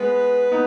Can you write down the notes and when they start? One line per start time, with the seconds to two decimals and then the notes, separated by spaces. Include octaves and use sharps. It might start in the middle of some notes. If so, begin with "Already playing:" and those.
Already playing: G#3 B3 B4
0.52 B3 D#4